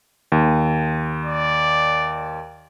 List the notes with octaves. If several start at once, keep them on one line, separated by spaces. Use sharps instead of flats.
D#2
D5